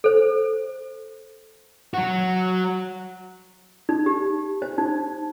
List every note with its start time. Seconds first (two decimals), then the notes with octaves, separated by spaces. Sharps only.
0.04 A4 C5
1.94 F#3 F#4
3.89 D#4
4.06 G4
4.62 C5
4.78 D#4